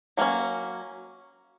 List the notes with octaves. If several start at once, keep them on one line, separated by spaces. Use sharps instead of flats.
F#3 A#3 C#4